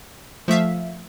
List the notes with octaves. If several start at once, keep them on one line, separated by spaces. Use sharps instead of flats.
F3 A3 E5 F5